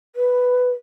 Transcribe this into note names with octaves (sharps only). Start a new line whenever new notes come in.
B4